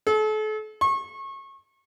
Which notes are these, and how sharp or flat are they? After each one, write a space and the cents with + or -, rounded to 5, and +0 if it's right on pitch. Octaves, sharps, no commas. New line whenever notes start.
A4 -40
C#6 -30